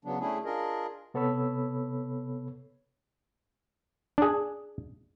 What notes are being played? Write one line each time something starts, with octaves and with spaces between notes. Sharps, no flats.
C#3 F#3 B3 D4
A3 C#4 D4 E4 G#4
D4 F4 G#4 A#4 D#5
C3 B3 A4 C#5 B5 E6
D4 G#4